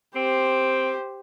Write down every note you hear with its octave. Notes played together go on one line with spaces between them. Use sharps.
C4 G4 C5